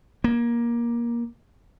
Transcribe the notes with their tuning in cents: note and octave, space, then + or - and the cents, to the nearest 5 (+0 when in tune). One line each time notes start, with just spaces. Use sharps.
A#3 +20